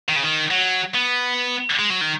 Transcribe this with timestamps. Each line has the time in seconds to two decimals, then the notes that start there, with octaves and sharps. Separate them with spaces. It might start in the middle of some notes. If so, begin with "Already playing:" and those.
0.08 D#3
0.16 C#3
0.23 D#3
0.51 F#3
0.94 B3
1.79 G#3
1.90 F#3
2.01 D#3